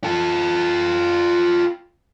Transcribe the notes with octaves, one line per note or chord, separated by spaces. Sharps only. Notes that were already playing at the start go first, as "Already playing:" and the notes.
F4 A4